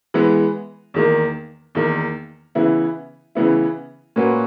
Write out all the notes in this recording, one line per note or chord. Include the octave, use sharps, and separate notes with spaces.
E3 G#3 B3
E2 D#3 A#3
E2 D#3 A#3
C#3 E3 B3 E4
C#3 E3 B3 E4
A#2 A#3 C#4 F#4 B4